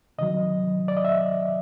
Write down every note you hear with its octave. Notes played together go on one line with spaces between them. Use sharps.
C3 D#3 F#3 D#5
D5
D#5
E5